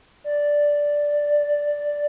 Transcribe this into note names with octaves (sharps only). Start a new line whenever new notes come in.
D5